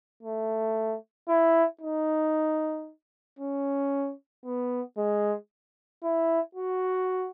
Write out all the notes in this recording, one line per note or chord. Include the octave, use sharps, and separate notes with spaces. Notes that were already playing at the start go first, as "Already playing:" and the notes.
A3
E4
D#4
C#4
B3
G#3
E4
F#4